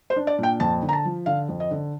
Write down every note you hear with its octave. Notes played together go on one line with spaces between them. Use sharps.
C5
D4
D5
A#2 G5
F2 A5
D3
A#5
A5
F3
D3 F5
F2
D#5
D3